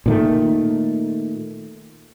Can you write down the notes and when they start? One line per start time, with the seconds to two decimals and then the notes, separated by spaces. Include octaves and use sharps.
0.06 A#2 D#3 A3